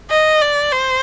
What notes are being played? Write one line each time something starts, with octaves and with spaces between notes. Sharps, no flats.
D#5
D5
C5